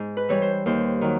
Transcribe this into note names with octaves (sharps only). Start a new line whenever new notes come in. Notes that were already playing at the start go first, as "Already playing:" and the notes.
Already playing: G#2
B4
E3 G3 C#5
C5
D#2 C5
D#3 F#3